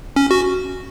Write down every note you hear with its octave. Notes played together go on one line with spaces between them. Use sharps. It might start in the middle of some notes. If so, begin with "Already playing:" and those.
C#4
F#4